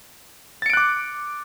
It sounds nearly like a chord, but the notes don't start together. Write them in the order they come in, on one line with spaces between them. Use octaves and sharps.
A6 C#7 D7 F#6 D6